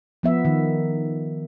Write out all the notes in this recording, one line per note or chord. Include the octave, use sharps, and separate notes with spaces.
F3 B3 E5
D#3